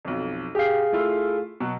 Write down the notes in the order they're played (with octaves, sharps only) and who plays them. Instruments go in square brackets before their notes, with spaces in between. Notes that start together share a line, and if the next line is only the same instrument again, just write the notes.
[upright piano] B1 F2
[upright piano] G4 C7 [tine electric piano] G#4 F5
[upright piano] A3 E4 F4
B2 F#3